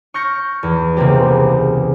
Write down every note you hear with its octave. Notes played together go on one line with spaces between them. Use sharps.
C#6 F6 G6 A#6 C#7
E2
C#2 C3 A#3 C4 G4